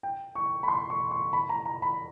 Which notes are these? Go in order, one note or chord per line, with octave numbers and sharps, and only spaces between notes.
G5
C#6
B5
C6
C#6
C#6
B5
A#5
A#5
B5